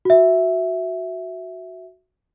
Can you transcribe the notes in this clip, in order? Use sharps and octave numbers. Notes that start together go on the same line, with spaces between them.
F#4 E5